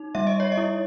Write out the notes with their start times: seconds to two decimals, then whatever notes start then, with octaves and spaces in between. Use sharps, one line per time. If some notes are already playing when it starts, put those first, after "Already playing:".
Already playing: D#4
0.15 G3 E5
0.27 D#5
0.40 C#5
0.52 D#5
0.57 E4